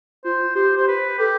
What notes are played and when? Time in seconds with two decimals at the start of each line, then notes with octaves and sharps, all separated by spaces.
0.24 F4 C5
0.55 G4 C5
0.77 C5
0.88 B4
1.19 G4 A4